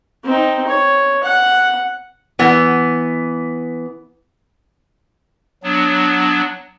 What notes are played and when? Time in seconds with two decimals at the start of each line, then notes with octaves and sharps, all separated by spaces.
0.24 C4 D#4
0.67 C#5
1.23 F#5
2.39 E3 B3
5.63 F#3 B3 D4